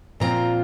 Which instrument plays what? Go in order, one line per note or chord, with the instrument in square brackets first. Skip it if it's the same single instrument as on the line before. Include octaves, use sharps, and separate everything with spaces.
[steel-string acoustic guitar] A#2 F3 C4 F4 A#5